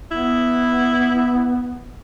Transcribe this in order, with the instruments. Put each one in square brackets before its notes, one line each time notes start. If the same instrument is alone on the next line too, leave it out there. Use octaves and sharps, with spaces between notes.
[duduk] B3 [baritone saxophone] E4